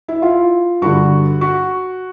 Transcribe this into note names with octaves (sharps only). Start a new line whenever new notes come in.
E4
F4
G2 D3 F#4
F#4